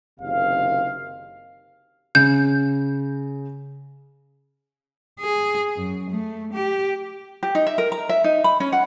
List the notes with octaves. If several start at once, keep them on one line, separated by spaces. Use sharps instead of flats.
F#1 C3 D#3 F5
C#3 G6
G#4
F#2
A3
G4
G4
D#4
E5
A#4
A#5
E5
D#4
B5
C#4
F#5